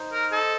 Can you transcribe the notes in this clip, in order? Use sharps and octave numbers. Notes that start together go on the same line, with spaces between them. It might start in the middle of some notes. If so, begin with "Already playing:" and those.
Already playing: D#4 C5
A#4
A4 D#5